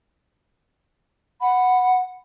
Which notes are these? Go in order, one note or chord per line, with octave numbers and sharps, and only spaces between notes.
F#5 B5